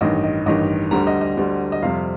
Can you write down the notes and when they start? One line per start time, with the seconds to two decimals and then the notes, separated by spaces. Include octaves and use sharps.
0.01 A1 G2 D#3 D#5
0.24 D#5
0.46 A1 G2 D#3 D#5
0.91 D2 D3 G3 A#5
1.07 D#5
1.21 D#5
1.37 D2 D3 G3
1.72 D#5
1.82 F2 C3 G3 F5